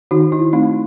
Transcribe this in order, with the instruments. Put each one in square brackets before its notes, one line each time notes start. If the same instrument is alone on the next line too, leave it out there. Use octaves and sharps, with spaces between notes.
[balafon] D#3 D#4 F#4
E4
A3 C4 D#4